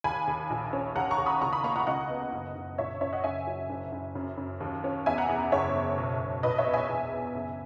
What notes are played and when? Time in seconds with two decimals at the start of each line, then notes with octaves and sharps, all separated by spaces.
0.04 D#2 G#5 B5
0.27 D#2
0.50 A#1
0.73 C#4
0.95 D#2 F#5 A#5
1.11 A#5 C#6
1.18 D#2
1.26 B5 D#6
1.41 C#2 A#5 C#6
1.53 B5 D#6
1.64 A#3 A#5 C#6
1.76 F#5 A#5
1.87 C#2 D#5 F#5
2.09 B3
2.33 F#1
2.55 F#1
2.78 A#1 C#5 E5
3.01 C#4 C#5 E5
3.13 D#5 F#5
3.24 F#1 E5 G#5
3.47 F#3
3.69 F#1
3.92 F#1
4.15 F#2
4.37 F#2
4.60 D#2
4.84 C#4
5.06 E2 E5 G#5
5.18 F#5 A#5
5.29 E2
5.52 F#1 C#5 E5
5.75 F#1
5.98 B1
6.21 B1
6.43 A#1 B4 D#5
6.58 C#5 E5
6.66 B3
6.73 E5 G#5
6.89 E2
7.12 B3
7.35 F#1